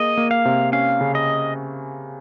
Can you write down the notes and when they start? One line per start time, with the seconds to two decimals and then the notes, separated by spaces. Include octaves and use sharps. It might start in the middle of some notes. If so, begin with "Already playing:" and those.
Already playing: A#3 G#4 D#5
0.17 A#3
0.31 F5
0.45 C3
0.72 C#4 F5
1.01 C#3
1.15 D#5